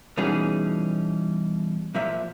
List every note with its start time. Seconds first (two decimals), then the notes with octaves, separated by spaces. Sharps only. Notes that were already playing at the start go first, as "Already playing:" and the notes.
0.17 B2 E3 G3 C#4 D#4 G#4
1.95 A#2 F3 E5